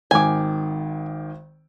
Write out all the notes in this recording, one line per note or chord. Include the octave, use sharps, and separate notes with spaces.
G#1 D#3 G#5 D6